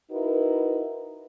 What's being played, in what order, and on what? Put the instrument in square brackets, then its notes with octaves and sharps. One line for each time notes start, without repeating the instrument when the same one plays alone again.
[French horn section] D#4 E4 F#4 A#4 B4